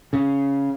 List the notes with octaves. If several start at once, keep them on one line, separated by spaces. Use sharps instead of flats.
C#3